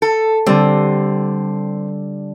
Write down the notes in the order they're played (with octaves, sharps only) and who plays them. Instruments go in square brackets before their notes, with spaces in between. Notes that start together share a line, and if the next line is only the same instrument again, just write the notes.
[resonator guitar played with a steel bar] A4
[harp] D3 G3 [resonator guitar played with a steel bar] C4